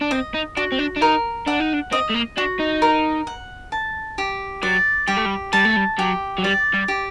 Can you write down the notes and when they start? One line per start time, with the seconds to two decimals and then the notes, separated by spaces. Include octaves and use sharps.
0.01 D4
0.11 C4 D#5
0.34 D#4
0.57 D4 F#4
0.72 C4
0.79 D4
0.97 D4
1.02 D#4 A#4
1.47 D4 F#5
1.60 D#4
1.74 D4
1.92 C4 D#5
2.10 A3
2.15 A#3
2.37 D4 F#4
2.60 D#4
2.82 A#4
3.27 F#5
3.72 A5
4.18 G4
4.63 F#3 D5
5.08 G3 G4
5.17 A3
5.25 G3
5.53 G3 A5
5.65 A3
5.76 G3
5.98 F#3 G4
6.38 F#3
6.43 G3 D5
6.74 G3
6.88 G4